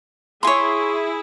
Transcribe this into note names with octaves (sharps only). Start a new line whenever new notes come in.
E4 G#4 C#5 G#5 C6